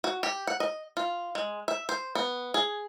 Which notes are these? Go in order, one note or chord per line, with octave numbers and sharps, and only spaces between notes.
F#4
G4
F#5
D#5
F4
G#3
E5
C5
B3
G#4